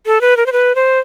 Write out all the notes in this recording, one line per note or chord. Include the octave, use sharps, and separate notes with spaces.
A4
B4
A#4
C5
B4
C5